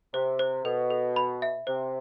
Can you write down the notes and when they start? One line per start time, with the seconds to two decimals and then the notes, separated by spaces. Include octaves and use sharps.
0.14 C3 C5
0.39 C5
0.64 B2 A4
0.90 A4
1.16 B5
1.42 E5
1.67 C3 C5